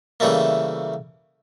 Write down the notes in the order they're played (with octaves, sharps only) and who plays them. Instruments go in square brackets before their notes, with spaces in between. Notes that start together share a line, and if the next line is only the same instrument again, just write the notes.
[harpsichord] C#3 E3 G3 A3 A#3